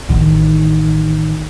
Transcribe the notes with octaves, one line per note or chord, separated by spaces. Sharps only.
A1 D#3